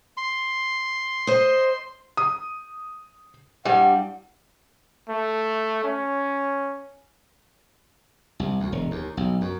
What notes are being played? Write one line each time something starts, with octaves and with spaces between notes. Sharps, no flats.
C6
C5 D#5
D#6
G2 G3 F#5
A3
C#4
C2
D2
E1
D#2
B1
F#2